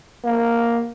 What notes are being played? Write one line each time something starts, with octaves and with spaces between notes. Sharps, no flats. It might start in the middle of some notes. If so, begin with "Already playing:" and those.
A#3